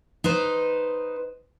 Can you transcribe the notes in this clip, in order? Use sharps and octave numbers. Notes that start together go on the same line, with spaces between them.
D#4 B4 C5